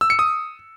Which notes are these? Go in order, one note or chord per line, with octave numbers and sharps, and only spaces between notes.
E6
C#7
D#6